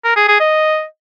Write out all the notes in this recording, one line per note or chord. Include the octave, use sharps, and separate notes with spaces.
A#4
G#4
G#4
D#5